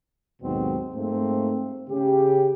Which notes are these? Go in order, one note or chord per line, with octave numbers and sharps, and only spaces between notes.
D#2 G#2 B2 F#3 C4
G#2 A3 A#3 C4
C#3 G4